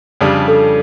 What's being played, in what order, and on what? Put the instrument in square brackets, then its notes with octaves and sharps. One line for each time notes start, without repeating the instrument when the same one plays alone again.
[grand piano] F2 C#3 G3 D4
[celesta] A4